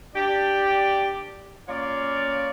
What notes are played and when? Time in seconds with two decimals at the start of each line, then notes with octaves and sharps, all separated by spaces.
0.15 D4 G4 D5
1.69 A#3 C#4 F4 C#5 D5 F5